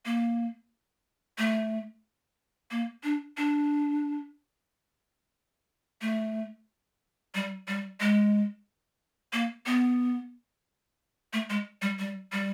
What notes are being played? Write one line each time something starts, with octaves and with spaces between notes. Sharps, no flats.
A#3
A3
A#3
D4
D4
A3
G3
G3
G#3
A#3
B3
A3
G#3
G3
G3
G3